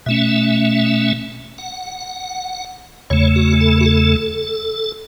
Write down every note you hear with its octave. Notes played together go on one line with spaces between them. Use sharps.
B2 A3 C#4 E5
F#5
E2 C#3 A3 C#5
F#4
A4
F#4
A4